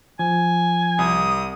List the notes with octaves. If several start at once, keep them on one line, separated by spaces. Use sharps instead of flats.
F3 G#5
C2 D#6